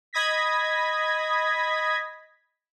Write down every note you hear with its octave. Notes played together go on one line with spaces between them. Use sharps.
D#5 B5 D#6 G#6 A#6 B6